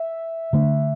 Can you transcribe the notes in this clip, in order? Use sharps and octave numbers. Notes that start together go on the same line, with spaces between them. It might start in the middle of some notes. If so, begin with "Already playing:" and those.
Already playing: E5
D3 A3 D4